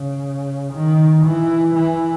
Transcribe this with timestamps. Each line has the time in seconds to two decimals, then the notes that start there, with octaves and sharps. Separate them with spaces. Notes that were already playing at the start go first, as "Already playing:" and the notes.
Already playing: C#3
0.73 D#3
1.25 E3
1.75 E3